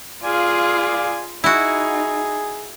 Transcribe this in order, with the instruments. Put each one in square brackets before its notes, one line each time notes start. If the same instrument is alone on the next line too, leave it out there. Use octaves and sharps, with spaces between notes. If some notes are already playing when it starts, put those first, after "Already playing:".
[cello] F4 G#4 [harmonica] D5 F5 G#5
[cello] D#4 [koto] E4 F#4 [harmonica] G#4